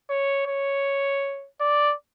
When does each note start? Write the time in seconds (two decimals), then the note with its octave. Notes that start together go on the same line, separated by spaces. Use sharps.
0.10 C#5
0.46 C#5
1.60 D5